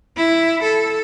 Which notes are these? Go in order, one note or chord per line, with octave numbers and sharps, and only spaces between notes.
E4
A4